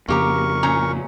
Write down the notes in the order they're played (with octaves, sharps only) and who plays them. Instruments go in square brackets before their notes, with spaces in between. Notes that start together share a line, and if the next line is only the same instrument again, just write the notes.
[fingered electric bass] F2 C#3 [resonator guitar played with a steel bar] A#3 G4 A#5 [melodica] A#4 C#6
[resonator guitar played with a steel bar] A#2 C#4 A#5